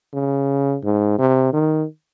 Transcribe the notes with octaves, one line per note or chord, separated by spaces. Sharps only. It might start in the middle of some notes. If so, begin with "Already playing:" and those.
C#3
G#2
C3
D#3